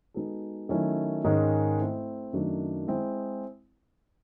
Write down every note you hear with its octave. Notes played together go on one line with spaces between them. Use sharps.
G#3 B3 D#4 F#4 A4
D#3 F#3 A3 C#4 E4
G#2 D#3 G#3 C#4
A3 C4 E4
F#2 D#3 F#3 A3 D4
G#3 C4 E4